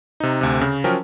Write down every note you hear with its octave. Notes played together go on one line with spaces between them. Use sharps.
C3 D#4
D2 C3
C#3
F3 F#3 C#4 A#4 G5